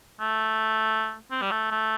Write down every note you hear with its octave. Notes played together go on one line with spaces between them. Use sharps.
A3
C4
G3
A3
A3